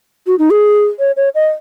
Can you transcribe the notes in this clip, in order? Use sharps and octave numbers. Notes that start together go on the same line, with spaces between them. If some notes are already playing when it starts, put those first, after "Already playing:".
F#4
D#4
G#4
C#5
C#5
D#5